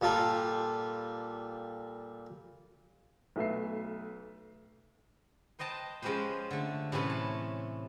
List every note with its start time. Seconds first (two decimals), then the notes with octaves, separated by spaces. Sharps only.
0.01 A#2 G3 F4 A4
3.36 B1 A3 B4 E5 C7
5.59 B4 C5 D#5 G5 A5 A#5
6.02 F3 G#3 C#4 G4 B4 C5
6.51 D3 A3
6.92 A2 C3 E3 C#4 B4 C6
7.10 A5